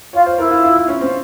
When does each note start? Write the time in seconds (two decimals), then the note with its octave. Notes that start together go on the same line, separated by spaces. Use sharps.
0.13 F4 C#5
0.26 C5
0.38 E4 A#4
0.51 F4
0.63 F4
0.76 E4
0.88 C#4
1.01 C4